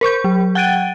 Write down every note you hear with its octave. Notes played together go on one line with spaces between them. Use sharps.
A#4 C5 C#6 G6
F#3
F#5 G5 F#6 A6 D7 D#7